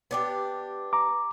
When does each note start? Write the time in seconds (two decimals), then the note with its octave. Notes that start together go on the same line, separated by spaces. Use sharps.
0.11 B3 D4 G4
0.93 A#5 D6